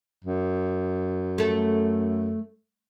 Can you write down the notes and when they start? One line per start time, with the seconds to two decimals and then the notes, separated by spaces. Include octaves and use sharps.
0.24 F#2
1.38 A3 A4